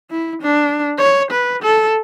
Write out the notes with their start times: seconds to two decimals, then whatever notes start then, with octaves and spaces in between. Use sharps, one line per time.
0.11 E4
0.42 D4
0.98 C#5
1.31 B4
1.63 A4